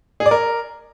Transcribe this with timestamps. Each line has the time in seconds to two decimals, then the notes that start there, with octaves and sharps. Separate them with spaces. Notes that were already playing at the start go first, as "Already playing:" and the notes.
0.20 G#4
0.26 D5
0.31 A#4